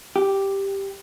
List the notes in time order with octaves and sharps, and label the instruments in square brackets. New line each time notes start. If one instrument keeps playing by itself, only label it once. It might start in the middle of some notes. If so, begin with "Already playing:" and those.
[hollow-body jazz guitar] G4